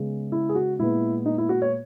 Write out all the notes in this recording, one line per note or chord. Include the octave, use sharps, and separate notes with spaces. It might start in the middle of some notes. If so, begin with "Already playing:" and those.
Already playing: C#3 G#3 B3
E4
G#4
F#4
A#2 G#3 B3 E4
D#4
E4
F#4
C#5